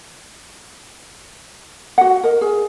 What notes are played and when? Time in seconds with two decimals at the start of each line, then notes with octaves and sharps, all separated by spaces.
1.98 F#4 F#5
2.23 A#4 D#5
2.41 G#4